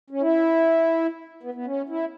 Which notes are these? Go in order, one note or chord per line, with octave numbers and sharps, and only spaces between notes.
C#4
E4
B3
B3
C#4
E4